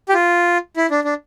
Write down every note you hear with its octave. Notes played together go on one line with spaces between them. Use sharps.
G4
F4
E4
D4
D4